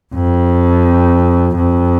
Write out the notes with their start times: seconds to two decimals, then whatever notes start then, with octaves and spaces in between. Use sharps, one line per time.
0.13 F2
1.56 F2